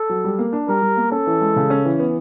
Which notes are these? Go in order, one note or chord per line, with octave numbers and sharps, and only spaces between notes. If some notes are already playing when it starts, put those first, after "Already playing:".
Already playing: A4
F#3
G3
A#3
D4
G3 A#4
G3
A#3
C#4 A4
E3
G#3
C#3
C#4
E3
B3